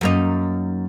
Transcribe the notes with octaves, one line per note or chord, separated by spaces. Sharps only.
F#2 A#3 D#4